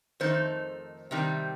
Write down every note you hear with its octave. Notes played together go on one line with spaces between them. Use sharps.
F2 D#3 A3 D#4 C5
C3 D#3 G3 C4 D#4